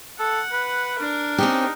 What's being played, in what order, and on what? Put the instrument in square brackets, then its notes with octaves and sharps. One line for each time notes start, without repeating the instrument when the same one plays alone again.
[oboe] A4 [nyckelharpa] F#5
[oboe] B4
[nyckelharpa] D4 A#4
[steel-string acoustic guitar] C4 C#4 G4 [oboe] D#4